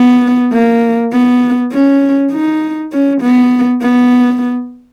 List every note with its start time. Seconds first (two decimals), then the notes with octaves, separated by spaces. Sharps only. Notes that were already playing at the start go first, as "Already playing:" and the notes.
Already playing: B3
0.53 A#3
1.13 B3
1.73 C#4
2.32 D#4
2.92 C#4
3.22 B3
3.82 B3